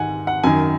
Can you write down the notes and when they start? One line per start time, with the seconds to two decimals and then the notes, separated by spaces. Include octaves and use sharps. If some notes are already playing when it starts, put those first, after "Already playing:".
Already playing: G#2 D#3 F#5 G#5
0.27 F#5
0.43 F#2 D#3 G#5